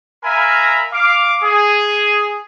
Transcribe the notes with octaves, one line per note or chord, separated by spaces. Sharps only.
A#4 E5 F5 G#5 A#5 B5
F5 D6
G#4